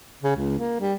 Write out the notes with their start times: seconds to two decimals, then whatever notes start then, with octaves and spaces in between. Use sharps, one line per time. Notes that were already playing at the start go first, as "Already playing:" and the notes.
0.23 C#3
0.36 C#2
0.59 A#3
0.80 G3